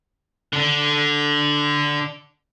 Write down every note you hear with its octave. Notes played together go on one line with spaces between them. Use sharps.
D3 D4